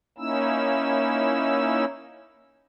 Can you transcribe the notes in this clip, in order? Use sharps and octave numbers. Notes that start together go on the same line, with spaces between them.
A#3 C#4 D#4 E4 E6